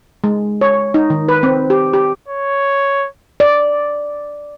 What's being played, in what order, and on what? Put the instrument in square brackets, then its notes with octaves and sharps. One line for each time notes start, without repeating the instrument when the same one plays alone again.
[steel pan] G#3
C#5
D#4
D#3
B4
C4
G4
G4
[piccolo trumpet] C#5
[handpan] D5